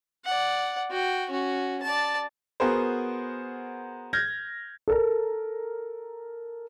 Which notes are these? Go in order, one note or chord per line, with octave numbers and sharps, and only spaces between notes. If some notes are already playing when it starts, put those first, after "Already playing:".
D5 F#5
F#4 G5
C#4 F#4
D5 A5
B3 F#4 G#4 A#4 C5
F6 G6 G#6 A#6
A4 A#4